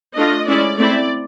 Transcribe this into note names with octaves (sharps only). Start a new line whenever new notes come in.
A3 D4 F4 D#5
G#3 C#4 E4 D5
A3 C4 E4 D5